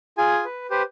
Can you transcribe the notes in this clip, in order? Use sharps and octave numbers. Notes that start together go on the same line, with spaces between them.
F4 G#4 G#5
B4
G4 B4 C5